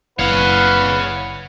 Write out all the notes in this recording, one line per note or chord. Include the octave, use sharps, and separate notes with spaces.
F#1 E4 B4 C#5 D5 F5 F#5